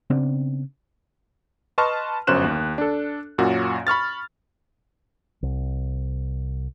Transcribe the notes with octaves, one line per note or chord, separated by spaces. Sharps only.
C#3 B3 C4 D4
B4 D#5 A5 C6 C#6 F6
G1 F#2 C#4 C5 F#6 E7
D#2
D4 A4
F#2 A#2 C#4 F#4
B5 C#6 F6 A6
C2